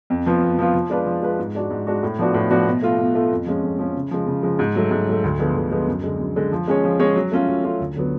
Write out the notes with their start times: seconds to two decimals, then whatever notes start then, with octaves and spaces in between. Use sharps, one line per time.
0.10 F2
0.26 F3 B3 F4
0.43 F2
0.59 F3 B3 F4
0.74 F3
0.90 G#3 D4 F4 B4
1.06 F3
1.23 G#3 D4 F4 B4
1.39 G#2
1.55 G#3 D4 F#4
1.70 G#2
1.87 G#3 D4 F#4
2.03 A2
2.19 F3 B3 D4 F#4
2.34 A2
2.50 F3 B3 D4 F#4
2.67 B2
2.82 A3 F4
2.98 B2
3.15 A3 F4
3.31 F2
3.46 F3 G#3 C#4
3.63 F2
3.79 F3 G#3 C#4
3.95 C#3
4.11 F3 G#3
4.27 C#3
4.43 F3 G#3
4.59 G#2
4.75 F#3 A3
4.91 G#2
5.07 F#3 A3
5.24 D2
5.39 D3 F3 G#3 B3
5.56 D2
5.71 D3 F3 G#3 B3
5.87 F#2
6.04 D3 G#3
6.19 F#2
6.36 D3 G#3
6.52 F3
6.68 G#3 C#4 G#4 C#5
6.84 F3
6.99 G#3 C#4 G#4 C#5
7.16 F#3
7.32 A3 C#4 F4 A4
7.48 F#3
7.64 A3 C#4 F4 A4
7.80 D2
7.96 D3 F#3 B3